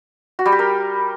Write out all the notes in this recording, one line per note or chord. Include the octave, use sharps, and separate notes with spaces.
F#4
G3
G4
A#4